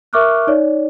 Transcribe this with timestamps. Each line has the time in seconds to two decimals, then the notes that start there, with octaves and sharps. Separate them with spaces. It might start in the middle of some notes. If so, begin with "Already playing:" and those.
0.13 A#4 E5 C#6 D6 F6 F#6
0.47 D#4 C#5 D5